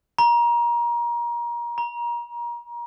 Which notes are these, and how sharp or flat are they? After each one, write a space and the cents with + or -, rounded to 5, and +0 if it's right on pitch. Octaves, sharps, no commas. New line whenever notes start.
A#5 +25
A#5 +30